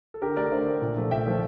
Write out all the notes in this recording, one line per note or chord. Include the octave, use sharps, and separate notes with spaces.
A4
D3 G4 A#4
A3 A#4 D5
D3 C5 E5
A3
A#2
F3 A3
A#2 E5 G5
F3 A3